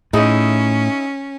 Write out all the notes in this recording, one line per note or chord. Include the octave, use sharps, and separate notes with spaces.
A2 C#4 D#4 E4 G#4